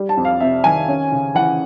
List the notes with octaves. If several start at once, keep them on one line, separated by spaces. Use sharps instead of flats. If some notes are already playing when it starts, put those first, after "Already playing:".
Already playing: G3
A5
F2
F5
C3 E5
D#3 G#5
C#4
C#3
E3 F#5